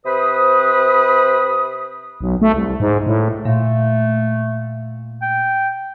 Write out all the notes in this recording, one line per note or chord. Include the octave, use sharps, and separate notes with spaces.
C3 B4 C5 B5 D#6
B1
A3
C2
G#2
A2
A#2 A3
G5